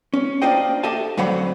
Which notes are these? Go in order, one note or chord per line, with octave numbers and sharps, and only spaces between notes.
C#4
A#3 D4 F4 C5 D#5 G5
G4 A4 D#5 E5 G#5 A5
F2 D3 F#3 C5 F#5 B5